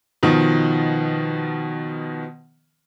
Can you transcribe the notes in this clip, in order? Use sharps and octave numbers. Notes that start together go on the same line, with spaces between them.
B2 D#3 F3